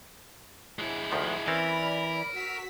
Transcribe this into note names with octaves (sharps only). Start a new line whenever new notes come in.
G#3 E4
D2 D#3 F3
E3 C4 C#4 A#4 D5 B5
F#4 E6 B6